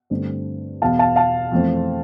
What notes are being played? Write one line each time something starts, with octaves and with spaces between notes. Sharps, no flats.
G2 D3 A3 C4
E2 B2 B3 F5 A5
F5 A5
F5 A5
F2 E3 A3 C4